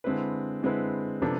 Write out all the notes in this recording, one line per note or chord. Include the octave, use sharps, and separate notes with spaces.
D3 G#3 C4 E4 B4
D3 G#3 C4 E4 B4
C3 F3 B3 D4 A4